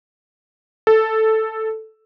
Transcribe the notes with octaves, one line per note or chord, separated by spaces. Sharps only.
A4